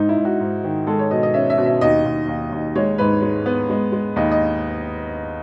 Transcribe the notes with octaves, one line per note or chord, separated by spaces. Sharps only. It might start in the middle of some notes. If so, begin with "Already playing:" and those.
Already playing: G#2 D#4
E4
G#2
F#4
G#2
D#3
G#3 A4
C#5
B2 D#5
D#5
C#4 E5
E5
B2
E5
D#2 D#5
D#2
D#2
D#2
G#3 C#5
G#2 B4
G#3
B3
G#3
G#3
D#2 D#5
D#5